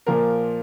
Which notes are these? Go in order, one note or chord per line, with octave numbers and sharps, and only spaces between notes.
A#2 F3 A#3 A#4